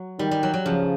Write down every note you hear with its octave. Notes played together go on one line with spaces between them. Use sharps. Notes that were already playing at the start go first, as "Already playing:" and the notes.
Already playing: F#3
D#3 G3
G3
F#3
F#3
C#3 F3